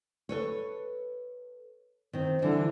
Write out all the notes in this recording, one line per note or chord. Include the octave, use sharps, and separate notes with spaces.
A4 B4 C#5
D#3 C4
D3 E3 F3 G3